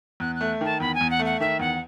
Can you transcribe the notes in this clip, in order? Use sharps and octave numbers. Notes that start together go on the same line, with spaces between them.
E2 F#6
F#6
A3
D#3 A5
E2 B5
G#5
E2
F#5
A3
F#5
D#3 E5
E2 F#5